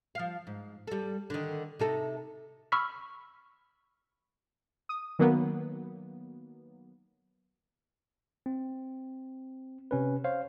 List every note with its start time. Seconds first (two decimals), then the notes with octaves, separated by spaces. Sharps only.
0.15 F3 F5
0.47 G#2
0.87 G3 A4
1.30 D3 D#3
1.79 C3 D#4 A4
2.72 B5 C#6 E6 F6 B6
4.89 D#6
5.19 D#3 F#3 A#3 B3
8.46 C4
9.91 C3 C#4 B4
10.24 C5 C#5 F5